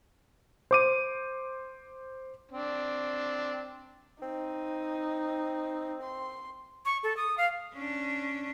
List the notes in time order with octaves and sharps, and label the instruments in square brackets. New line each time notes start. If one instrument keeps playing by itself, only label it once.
[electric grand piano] C5 D6 D#7
[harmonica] C4 D4
[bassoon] C4 [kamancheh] D#4
[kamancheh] C6
[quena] C#6
A4
D#6
F5
[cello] C#4 D4